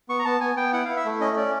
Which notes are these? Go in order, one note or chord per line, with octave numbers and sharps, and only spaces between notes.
B3 C#6
A#5
B3 A5
B3 G#5
B3 G5
E4 F#5
E4 F5
E5
A3
C#4 D#5
C#4 D5